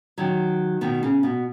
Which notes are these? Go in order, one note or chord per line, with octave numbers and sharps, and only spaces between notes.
D#3 F#3
B2 D#3
C#3
B2